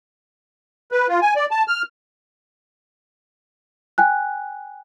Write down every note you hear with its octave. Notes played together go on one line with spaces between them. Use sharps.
B4
F4
G#5
D5
A5
F6
G5 G#5 F#6